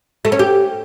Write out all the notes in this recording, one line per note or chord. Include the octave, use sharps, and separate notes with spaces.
A3
C#4
G4